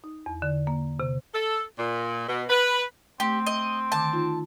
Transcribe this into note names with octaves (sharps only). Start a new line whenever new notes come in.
D#4
E2
D3
A#3
C3
A4
A#2
B2
B4
A3 C4 G4
D#5
D3 D#3 A5 D6
D#4 F4